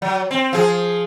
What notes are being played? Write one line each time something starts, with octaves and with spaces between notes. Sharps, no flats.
F#3
C4
F3 G#4